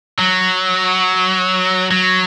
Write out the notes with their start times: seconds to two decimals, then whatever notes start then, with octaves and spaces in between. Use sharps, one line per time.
0.19 F#3
1.91 F#3